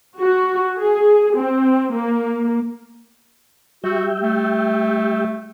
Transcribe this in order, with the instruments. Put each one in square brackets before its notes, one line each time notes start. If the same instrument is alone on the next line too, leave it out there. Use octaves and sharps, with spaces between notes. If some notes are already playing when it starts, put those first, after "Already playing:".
[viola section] F#4
G#4
C4
A#3
[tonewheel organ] G3 E5 G5 [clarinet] F#4
[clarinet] A3